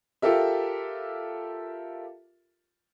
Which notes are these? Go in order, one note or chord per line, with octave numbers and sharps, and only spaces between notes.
F4 G4 A4 A#4 E5